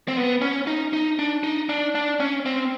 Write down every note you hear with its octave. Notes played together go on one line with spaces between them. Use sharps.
C4
B3
C#4
D#4
D#4
D4
D#4
D4
D4
C#4
C4